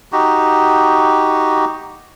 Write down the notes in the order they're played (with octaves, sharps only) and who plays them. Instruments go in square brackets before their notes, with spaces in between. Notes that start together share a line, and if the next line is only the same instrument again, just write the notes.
[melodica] D#4 F#4 G4